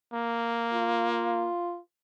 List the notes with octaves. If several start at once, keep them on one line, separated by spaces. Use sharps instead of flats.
A#3
F4